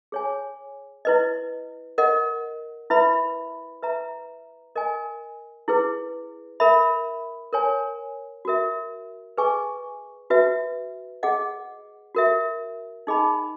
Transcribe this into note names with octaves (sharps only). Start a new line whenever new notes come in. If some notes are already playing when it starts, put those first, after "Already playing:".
G#4 C#5 G#5
E4 B4 D#5
A#4 D#5 F#5
E4 B4 E5 B5
B4 E5 A#5
A#4 D#5 G#5
E4 G#4 B4
A#4 E5 B5
A#4 C#5 G#5
F#4 A#4 E5
G#4 B4 D#5 G#5 C#6
F#4 B4 E5
G#4 D#5 F#5
F#4 A#4 E5
D#4 G#4 D#5 G#5 B5